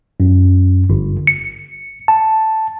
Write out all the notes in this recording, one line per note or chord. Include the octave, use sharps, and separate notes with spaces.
F#2
G1
C#7
A5